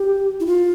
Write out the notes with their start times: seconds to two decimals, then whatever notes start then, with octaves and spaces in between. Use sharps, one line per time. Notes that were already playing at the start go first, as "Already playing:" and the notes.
Already playing: G4
0.40 E4
0.46 F4